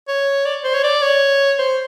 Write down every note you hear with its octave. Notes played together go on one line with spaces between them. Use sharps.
C#5
D5
C5
C#5
D5
C#5
C5